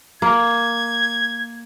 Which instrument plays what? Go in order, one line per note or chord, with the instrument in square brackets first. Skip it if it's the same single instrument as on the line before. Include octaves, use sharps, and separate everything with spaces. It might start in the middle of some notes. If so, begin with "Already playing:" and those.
[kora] A#3 [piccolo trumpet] G#6